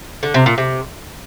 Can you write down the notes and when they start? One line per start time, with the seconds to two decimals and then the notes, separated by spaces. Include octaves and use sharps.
0.23 D3
0.34 C3
0.46 A#2
0.58 C3